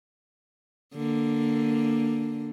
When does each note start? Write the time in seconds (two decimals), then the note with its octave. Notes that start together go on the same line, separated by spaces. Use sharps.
0.95 D3 A#3